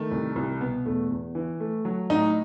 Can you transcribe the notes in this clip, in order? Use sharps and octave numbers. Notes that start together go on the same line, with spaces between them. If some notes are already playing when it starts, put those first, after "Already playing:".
Already playing: D#3 A3
C2
C2
B2 B3
E2 A3
E2
E3
A3
F#3
A2 D#4